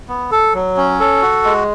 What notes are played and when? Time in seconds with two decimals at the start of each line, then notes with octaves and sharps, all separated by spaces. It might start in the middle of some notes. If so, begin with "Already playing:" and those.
0.08 B3
0.31 A4
0.54 F#3
0.77 C#4
1.00 A4
1.22 F#4
1.44 G#3